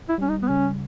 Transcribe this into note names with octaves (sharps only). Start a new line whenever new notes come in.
E4
G3 C#4
D#4
B3
C#3 C#4